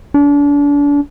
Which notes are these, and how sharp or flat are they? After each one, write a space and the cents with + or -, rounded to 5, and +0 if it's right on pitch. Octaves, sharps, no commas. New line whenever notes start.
D4 -35